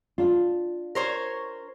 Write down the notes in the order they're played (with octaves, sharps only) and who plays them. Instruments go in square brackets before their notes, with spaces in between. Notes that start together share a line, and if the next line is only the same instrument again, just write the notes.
[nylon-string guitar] D4 F4
[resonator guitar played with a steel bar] A#4 C5 C#5